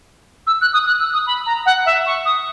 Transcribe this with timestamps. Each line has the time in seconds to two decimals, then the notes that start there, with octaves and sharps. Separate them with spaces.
0.47 E6
0.61 F#6
0.73 D#6
0.87 F#6
1.00 E6
1.13 D#6
1.27 B5
1.46 A#5
1.66 F#5
1.86 E5
2.06 C#6
2.25 D#6